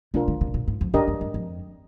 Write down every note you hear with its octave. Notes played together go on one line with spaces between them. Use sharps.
C3 D4 F4 A#4
D3
C3
A#2
G#2
F2
G2 D4 G4 A#4 D#5
F2
G2
F2